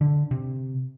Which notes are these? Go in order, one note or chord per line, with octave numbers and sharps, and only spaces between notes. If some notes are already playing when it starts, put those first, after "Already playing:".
D3
C3